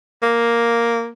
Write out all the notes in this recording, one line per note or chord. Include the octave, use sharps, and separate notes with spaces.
A#3